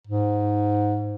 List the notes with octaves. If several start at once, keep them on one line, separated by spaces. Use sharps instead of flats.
G#2